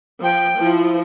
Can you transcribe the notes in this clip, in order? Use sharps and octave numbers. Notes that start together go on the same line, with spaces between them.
F3 G5
F3 E4